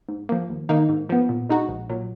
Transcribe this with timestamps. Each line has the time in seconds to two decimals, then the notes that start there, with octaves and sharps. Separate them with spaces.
0.09 G#2
0.29 F3 A#3
0.49 D#2
0.69 D#3 A#3 D#4
0.89 G#2
1.09 F3 B3
1.29 A#2
1.49 G#3 D#4 F#4
1.69 A#1
1.90 A#2 F#3